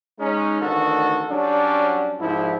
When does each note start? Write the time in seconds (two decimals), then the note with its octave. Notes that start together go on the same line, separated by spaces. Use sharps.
0.19 G#3 C#4 D#4
0.62 A1 D2 D3 D#3 F#4 A4
1.30 F#3 G3 C#4 D4
2.20 C2 G#2 F3 E4